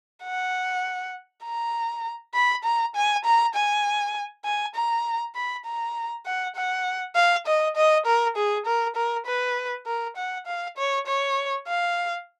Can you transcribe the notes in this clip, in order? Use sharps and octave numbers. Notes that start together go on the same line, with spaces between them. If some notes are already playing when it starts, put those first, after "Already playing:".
F#5
A#5
B5
A#5
G#5
A#5
G#5
G#5
A#5
B5
A#5
F#5
F#5
F5
D#5
D#5
A#4
G#4
A#4
A#4
B4
A#4
F#5
F5
C#5
C#5
F5